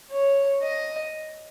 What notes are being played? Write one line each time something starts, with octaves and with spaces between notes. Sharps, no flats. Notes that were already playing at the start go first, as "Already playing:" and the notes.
C#5
D#5